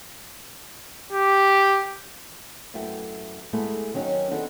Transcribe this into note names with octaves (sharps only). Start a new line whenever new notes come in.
G4
F#2 A3 E4 B4 E5 G5
G#3 A3 B3 E4 G#4 A4
D#3 F#3 C#4 D#4
B3 C4 D4 D#4 G#4 A4